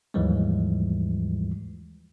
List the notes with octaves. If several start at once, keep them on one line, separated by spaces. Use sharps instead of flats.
D#2 G#2 E3 F3 G3 G#3